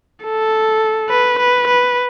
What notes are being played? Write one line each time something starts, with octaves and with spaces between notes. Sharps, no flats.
A4
B4
B4
B4